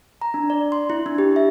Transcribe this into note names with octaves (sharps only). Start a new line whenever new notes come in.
A#5
D4
D5
C6
E4
D4
G4
E5